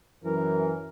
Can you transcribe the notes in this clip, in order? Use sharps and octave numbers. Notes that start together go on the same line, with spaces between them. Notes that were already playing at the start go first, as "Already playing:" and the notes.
F#2 E3 A#4